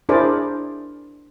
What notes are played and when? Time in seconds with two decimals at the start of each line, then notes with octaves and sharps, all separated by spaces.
0.09 D4 E4 G#4 A#4 C5 D5